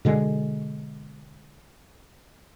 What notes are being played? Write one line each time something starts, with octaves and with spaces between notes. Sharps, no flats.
B2 D3 G#3